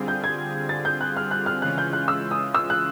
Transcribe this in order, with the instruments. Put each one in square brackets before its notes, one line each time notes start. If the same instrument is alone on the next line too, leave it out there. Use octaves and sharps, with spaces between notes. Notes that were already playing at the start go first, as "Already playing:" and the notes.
Already playing: [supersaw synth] D3 G3 C4 F4 G#4
[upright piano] G6
G#6
A6
G6
F#6
F6
F#6
F6
[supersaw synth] C#3 E3 G#3 C#4 F4 [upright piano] F#6
[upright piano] G6
F#6
E6
D#6
E6
F#6